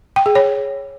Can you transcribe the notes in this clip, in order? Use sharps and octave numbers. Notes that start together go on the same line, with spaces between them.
G5
G#4
C#5